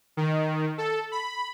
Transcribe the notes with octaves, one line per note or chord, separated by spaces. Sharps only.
D#3
A4
B5